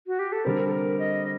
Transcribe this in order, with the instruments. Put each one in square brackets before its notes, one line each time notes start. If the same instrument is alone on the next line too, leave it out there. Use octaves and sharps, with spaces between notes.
[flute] F#4
G4
A4
[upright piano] D3 G3 C4 [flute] A#4
[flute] A4
A#4
D#5